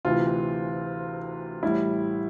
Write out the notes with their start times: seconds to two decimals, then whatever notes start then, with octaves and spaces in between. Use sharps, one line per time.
0.05 D2 C3 E3 F4
1.63 A1 A2 G3 E4